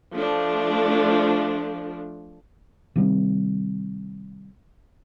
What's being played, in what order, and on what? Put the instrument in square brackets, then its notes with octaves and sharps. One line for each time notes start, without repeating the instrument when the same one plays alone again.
[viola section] F3 A3 D4
[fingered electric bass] C3 D#3 G3 C4